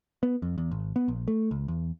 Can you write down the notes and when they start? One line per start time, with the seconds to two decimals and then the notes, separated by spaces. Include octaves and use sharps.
0.23 B3
0.42 F2
0.58 E2
0.71 G#1
0.96 B3
1.08 A#1
1.28 A3
1.51 C#2
1.68 E2